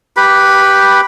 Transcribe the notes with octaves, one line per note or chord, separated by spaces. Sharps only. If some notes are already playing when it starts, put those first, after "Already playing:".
G4 B4 B5